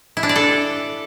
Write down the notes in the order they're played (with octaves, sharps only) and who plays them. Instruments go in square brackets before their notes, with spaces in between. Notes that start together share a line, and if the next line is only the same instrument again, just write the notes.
[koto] E4
D4
D5
A4